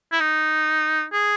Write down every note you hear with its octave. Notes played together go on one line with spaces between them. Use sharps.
E4
D#4
G#4